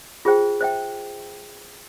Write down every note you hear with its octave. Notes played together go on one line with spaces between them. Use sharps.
F4 G#4 C5 G5
C5 E5 G5